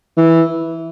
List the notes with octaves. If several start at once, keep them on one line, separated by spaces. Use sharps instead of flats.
E3